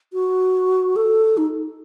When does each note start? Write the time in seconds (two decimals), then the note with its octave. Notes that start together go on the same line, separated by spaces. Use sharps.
0.13 F#4
0.96 A4
1.37 D#4